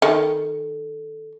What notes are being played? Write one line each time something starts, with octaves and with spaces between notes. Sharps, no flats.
D#3 A4